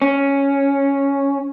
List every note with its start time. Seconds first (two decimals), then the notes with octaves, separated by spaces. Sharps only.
0.02 C#4